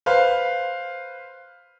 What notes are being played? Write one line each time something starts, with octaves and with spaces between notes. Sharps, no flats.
B4 C5 F5